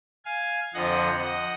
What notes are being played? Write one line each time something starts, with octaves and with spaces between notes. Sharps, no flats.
F5 G#5
F2 D3 F3 D#5 F#5
D#5 F#5